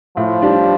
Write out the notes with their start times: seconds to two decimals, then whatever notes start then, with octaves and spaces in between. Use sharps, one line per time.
0.17 A2 F3
0.42 G3 D4 G4 D5